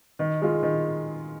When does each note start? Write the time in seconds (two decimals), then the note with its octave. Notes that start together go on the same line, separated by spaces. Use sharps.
0.19 D#3
0.42 G#3 F4
0.63 D#3